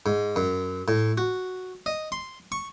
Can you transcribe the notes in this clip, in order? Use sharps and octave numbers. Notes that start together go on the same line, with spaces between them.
G#2
F#2
A2
F#4
D#5
C6
C#6